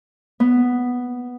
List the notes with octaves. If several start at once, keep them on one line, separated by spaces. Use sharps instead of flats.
B3